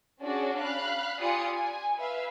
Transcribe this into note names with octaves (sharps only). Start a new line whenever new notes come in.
C#4 D4 F#4 G#4 D5
F5 B5 F#6
F4 G4 D5 G#5 D#6 C#7
G#5
B4 E5 F5